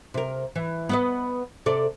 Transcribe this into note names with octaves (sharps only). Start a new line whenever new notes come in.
C3 A#4
E3
B3 B4 D#5
C3 A4 D5